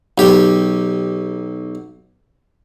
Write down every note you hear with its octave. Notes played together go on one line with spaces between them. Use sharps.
B1 G4